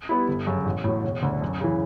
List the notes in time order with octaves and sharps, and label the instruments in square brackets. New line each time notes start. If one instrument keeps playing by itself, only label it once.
[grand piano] G3 B3 E4
G1
F#2 C#3
A1
A2 F#3
E1
D2 D3
F#2
C#3 E3